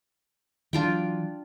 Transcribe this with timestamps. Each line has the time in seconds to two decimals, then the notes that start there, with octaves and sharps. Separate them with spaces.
0.73 E3 F#3 D4 F4 G5